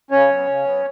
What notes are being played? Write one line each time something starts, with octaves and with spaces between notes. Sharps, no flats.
C#3 C#4 C#5
F#3 B3
C#3
F#3 B3